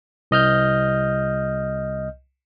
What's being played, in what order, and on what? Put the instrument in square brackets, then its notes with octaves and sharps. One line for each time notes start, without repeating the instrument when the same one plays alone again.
[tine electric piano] C2 D#5 F6 G6